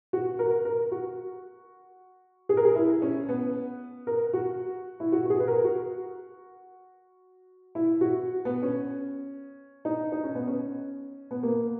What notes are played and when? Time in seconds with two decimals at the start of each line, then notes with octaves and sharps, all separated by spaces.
0.13 F#4
0.39 A#4
0.65 A#4
0.92 F#4
2.49 G#4
2.57 A#4
2.65 G#4
2.76 E4
3.02 C#4
3.29 B3
4.07 A#4
4.33 F#4
5.00 E4
5.12 F#4
5.26 F#4
5.30 G#4
5.40 B4
5.48 A#4
5.64 F#4
7.75 E4
8.01 F#4
8.45 B3
8.62 C#4
9.85 D#4
10.12 D#4
10.23 C#4
10.35 B3
10.47 C#4
11.31 B3
11.43 A#3